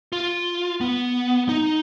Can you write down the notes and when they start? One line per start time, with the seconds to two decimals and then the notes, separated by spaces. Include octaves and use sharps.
0.13 F4
0.81 B3
1.49 D#4